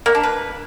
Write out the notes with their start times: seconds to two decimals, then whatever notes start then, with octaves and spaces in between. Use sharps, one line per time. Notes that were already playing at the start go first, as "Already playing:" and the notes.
0.06 A#3
0.15 D4
0.23 B4